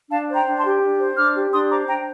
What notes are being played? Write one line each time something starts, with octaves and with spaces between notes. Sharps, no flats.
D4 F5 A5
C5
G5 A#5
D4
A5 C6
G4
D4
C5
D4 D6 F6
G4
D4 C6 D#6
C5 A#5 D6
D4 G5 A#5